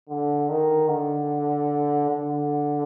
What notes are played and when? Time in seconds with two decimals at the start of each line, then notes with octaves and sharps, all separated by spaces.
0.09 D3
0.49 D#3
0.88 D3
2.09 D3